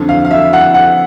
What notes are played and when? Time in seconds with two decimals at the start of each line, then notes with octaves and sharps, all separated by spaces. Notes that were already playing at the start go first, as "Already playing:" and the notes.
Already playing: F2 D3
0.09 F5
0.25 F5
0.31 E5
0.53 F#5
0.74 F#5